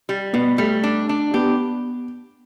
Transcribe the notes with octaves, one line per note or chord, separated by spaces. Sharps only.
G3
B2 B3
G3 A3
D4
D4
B3 G4